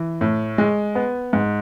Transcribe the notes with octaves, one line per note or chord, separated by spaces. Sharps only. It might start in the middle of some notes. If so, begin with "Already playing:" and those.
Already playing: E3
A2
G#3
B3
G#2